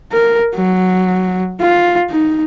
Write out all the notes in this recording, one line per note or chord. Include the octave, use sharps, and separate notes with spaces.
A#4
F#3
F4
D#4